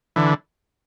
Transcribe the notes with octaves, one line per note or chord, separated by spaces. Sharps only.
D3 E3